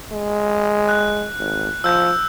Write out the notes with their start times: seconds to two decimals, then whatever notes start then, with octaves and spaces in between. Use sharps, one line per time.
0.12 G#3
0.89 F#6
1.39 G#1
1.84 F3 E6 G6